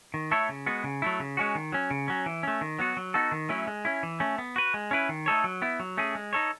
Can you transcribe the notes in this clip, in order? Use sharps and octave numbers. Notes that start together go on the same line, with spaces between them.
D#3
A3 E4 A4 C#5
C#3
G#3 B3 F#4
C#3
F#3 A3 E4
C#3
G#3 C#4 F#4
D#3
F#3 C#4
C#3
F#3 C#4
E3
A3 C#4
D#3
F#3 B3 F#4
F#3
B3 D#4 F#4 A4
D#3
F#3 A3 C#4 E4
G#3
C#4 E4
E3
A3 C#4
B3
F#4 B4
G#3
C#4 E4 B4
D#3
A3 D#4 A4 C#5
F#3
B3 E4
F#3
A3 C#4 G#4
G#3
D#4 A4 C#5